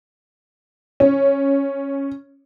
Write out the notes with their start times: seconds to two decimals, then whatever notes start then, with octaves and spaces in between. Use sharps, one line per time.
1.00 C#4